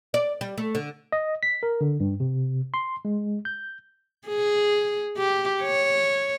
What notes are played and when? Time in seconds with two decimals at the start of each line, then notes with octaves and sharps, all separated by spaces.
0.14 D5
0.41 G3
0.58 A3
0.75 D3
1.12 D#5
1.43 B6
1.63 A#4
1.81 D3
2.00 G2
2.20 C3
2.74 C6
3.05 G#3
3.45 G6
4.27 G#4
5.18 G4
5.62 C#5